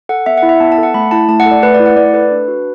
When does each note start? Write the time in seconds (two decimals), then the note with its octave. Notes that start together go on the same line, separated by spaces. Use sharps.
0.09 A4 F#5
0.26 B3 E5
0.38 F#5
0.43 E4
0.49 E5
0.60 B3 A5
0.72 A5
0.78 A4
0.83 F#5
0.94 A3 B5
1.11 E4 A5
1.29 A3 A5
1.40 F#5
1.46 A4
1.51 D5
1.63 A3 B4
1.74 D5
1.80 E4
1.86 F#5
1.97 A3 D5
2.14 A4 B4
2.31 D4
2.48 F#4